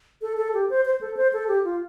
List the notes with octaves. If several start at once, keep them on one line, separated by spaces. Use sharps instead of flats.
A4
A4
G4
C5
C5
A4
C5
A4
G4
F4